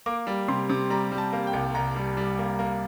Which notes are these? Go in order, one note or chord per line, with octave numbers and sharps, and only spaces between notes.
A#3 D6
G3
C3 C6
C3
G3 A#5
G3
A5
A#3
G5
C2
C2 A#5
G3
G3
A#3
A#3